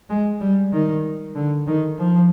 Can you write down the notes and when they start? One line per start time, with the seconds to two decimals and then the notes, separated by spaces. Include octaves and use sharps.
0.10 G#3
0.41 G3
0.72 D#3
1.35 D3
1.67 D#3
1.98 F3